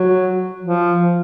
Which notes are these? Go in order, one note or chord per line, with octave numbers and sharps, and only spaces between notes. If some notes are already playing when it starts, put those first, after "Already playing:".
Already playing: F#3
F3